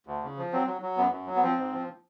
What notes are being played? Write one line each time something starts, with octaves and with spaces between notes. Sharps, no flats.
D2
C#3
F3
F#3 C4
F#3
F#3
F#2 B3
F#2
F#3
B3
F3 C4
G#2
F3